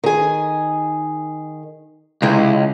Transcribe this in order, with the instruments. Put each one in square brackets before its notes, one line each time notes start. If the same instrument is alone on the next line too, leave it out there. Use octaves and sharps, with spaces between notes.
[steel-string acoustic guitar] D#3 G#4
[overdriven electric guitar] C#2 [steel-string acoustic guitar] C3 G#3 E4